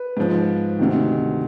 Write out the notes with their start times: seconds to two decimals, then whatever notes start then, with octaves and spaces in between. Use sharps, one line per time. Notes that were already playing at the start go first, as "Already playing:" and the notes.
Already playing: B4
0.17 G#2 F3
0.79 D2 C3 D#3